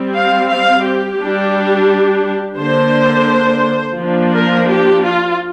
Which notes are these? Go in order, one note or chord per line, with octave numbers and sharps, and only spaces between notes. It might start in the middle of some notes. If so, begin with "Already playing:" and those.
Already playing: G3 C4
F5
F5
G4
G3 D4
D3 A#3 D4 C5
F3 A#3 D4
A#4
G4
F4